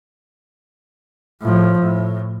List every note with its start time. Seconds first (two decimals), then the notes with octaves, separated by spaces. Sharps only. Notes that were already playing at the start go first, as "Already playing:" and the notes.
1.41 A2 F3
1.79 A2